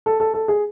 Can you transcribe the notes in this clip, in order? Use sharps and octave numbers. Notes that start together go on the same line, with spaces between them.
A4
A4
A4
G#4